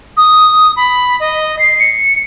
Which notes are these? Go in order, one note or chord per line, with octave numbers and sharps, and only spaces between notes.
D#6
B5
D#5
C7
C#7